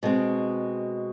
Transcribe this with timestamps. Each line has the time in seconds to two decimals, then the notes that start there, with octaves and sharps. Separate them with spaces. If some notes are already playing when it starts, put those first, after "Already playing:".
0.03 B2 G#3 C4